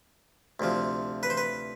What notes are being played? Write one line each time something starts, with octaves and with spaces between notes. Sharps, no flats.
D2 C3 F3
B4
C5
B4